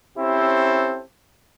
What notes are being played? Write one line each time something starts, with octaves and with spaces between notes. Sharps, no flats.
C4 C#4 E4 G4 A4 C5